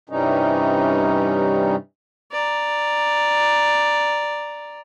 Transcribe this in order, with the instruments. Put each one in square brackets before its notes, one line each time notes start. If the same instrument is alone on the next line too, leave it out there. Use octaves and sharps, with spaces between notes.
[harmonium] G2 C3 E3 G3 C#4 D#4
[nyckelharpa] D5 A#5